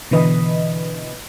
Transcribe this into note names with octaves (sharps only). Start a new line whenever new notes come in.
B2 D3 E3 B4 D#5